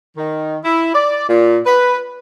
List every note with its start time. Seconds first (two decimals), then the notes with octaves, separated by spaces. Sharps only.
0.17 D#3
0.64 E4
0.94 D5
1.28 A#2
1.66 B4